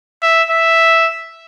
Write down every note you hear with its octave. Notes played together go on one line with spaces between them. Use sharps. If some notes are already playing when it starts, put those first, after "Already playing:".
E5
E5